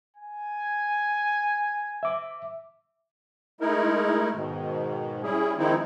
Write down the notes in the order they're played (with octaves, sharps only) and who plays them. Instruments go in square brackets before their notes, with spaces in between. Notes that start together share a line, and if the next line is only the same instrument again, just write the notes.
[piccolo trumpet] G#5
[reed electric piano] E5 D6
[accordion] G#3 A3 D#4 E4 A#4
G#2 B2 D#3
G3 C#4 E4 G#4
D#3 F3 G#3 C4 D#4 E4